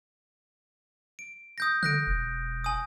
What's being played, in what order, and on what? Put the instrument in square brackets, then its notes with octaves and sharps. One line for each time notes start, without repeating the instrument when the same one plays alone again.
[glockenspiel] D7
D#6 G6 A#6
[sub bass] D3 [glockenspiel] F#6 A#6 D7
[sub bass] E1
[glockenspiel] G#5 D#6